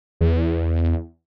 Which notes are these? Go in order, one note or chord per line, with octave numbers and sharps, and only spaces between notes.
E2